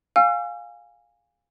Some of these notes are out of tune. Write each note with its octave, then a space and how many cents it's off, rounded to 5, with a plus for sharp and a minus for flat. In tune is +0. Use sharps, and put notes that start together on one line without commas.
F5 +15 G#5 -20 E6 +45